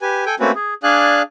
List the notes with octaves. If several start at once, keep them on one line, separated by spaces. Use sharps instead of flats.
G4 B4 G#5
A4 G5 G#5
A3 A#3 C4 C#4 F#4 B4
G#4
D4 G#4 D5 F5 G#5 F#6